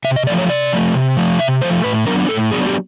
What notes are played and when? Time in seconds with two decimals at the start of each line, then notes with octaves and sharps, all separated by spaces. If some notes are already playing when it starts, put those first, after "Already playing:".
0.05 C3 E5
0.16 D#5
0.27 A3 D5
0.30 F3
0.38 C#5
0.50 C3 D5
0.73 F3 A3
0.94 C3
1.17 F3 A3
1.39 C3 E5
1.61 F3 A3 C5
1.84 A2 B4
2.07 F#3 B3 D4 A#4
2.29 A2 A4
2.51 F#3 B3 D4 G#4
2.67 G4